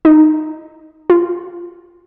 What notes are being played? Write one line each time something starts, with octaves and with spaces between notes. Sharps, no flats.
D#4
F4